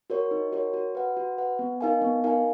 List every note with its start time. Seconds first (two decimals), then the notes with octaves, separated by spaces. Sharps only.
0.10 F#4 A#4 C#5
0.31 D#4
0.52 F#4 A#4 C#5
0.74 F#4
0.95 B4 F#5
1.17 F#4
1.38 B4 F#5
1.59 B3
1.81 D#4 A#4 F5 G#5
2.02 B3
2.24 D#4 A#4 F5 G#5